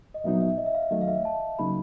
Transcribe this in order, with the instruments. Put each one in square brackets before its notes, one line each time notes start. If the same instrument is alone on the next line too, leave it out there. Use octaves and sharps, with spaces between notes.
[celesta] D#5
[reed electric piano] C2 A#2 F#3 B3 D#4 [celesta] E5
[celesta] E5
D#5
E5
F5
E5
[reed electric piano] D#2 D#3 F#3 A3 [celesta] D#5
[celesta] F5
E5
A5
[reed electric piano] C#3 F#3 A#3 D#4 [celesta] B5